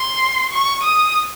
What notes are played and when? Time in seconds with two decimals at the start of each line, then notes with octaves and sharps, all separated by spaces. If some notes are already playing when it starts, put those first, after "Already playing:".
Already playing: C6
0.53 C#6
0.83 D#6